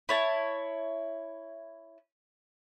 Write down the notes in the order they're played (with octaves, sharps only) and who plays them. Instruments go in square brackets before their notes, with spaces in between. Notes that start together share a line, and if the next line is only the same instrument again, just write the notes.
[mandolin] E4 C#5 A5